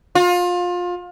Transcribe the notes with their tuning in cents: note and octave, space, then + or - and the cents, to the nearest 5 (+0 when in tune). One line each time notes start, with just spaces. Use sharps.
F4 +25